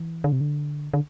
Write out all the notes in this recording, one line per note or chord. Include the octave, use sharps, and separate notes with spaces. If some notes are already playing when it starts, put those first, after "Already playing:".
Already playing: E3
D3
C3
D3
D3